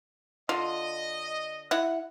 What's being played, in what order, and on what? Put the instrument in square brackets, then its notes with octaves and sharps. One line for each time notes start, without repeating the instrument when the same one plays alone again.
[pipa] D3 F4 [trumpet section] D#5
[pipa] E4 F#5